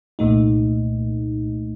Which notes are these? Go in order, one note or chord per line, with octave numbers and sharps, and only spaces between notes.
C2 A#2 A3 D#4